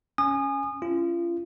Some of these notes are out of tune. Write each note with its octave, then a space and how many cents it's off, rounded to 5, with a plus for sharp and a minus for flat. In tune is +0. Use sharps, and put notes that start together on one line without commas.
C#4 +0 G#5 -5 D#6 -30
C#4 +0 F4 -35